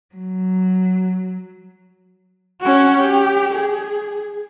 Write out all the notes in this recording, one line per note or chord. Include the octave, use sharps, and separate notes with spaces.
F#3
C#4 F#4
G4
G#4